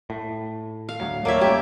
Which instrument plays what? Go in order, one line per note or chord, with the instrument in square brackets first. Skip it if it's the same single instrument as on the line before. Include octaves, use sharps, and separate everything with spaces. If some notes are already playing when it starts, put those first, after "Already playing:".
[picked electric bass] A2
[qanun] F5
[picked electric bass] D2 A2 F#3
[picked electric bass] D#2 F#3 A3 [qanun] A#3 D5 E5 [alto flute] C#5
[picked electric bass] G#1 G3 C#4 [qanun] G4